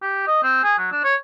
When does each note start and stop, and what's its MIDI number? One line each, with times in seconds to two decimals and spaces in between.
0.02 0.22 67
0.27 0.43 75
0.43 0.61 60
0.63 0.75 68
0.78 0.88 54
0.91 1.03 62
1.04 1.15 73